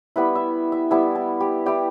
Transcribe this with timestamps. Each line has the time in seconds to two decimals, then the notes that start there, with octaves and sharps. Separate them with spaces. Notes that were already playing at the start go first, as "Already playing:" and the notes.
0.16 G3 B3 E4 B4
0.35 E5
0.72 E5
0.91 G3 B3 E4 A5
1.15 A5
1.40 G4
1.66 G3 E4 G4